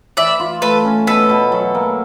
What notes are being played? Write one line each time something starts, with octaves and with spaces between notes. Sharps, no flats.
E3 D5 E5
F4
A3 A4 B4
C#4
B2 A4 B4
B2
F#3
A#3